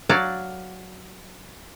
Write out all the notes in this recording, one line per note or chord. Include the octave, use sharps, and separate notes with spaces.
F#3 D5 F5 A5